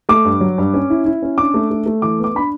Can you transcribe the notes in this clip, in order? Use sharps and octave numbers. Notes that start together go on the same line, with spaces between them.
A3 D6
G2
F#3
G2
C#4
E4
E4
C#4
D4 D6
A3
A3
A3
E3 D6
B3
D6
D4 B5